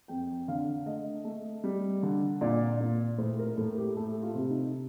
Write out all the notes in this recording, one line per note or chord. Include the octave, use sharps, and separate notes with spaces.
F2 G5
D3 F5
A3 D#5
A3
G3
D3
A#2 D5
A#2
A2 C5
A#4
A2 A4
G4
A3 A4
F4
C3
D#4